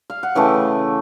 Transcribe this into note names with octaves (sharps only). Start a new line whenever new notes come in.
F5
F#5
C#3 E3 A3 G5